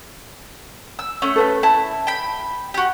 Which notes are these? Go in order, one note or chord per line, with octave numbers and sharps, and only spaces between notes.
E6
A3 C#4
A4 B4 E5
E4 A5
G5 B5
F#4 G4